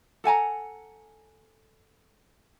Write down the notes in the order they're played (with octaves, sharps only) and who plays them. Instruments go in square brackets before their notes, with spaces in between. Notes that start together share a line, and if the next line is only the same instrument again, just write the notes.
[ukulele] A4 F#5 G#5 A#5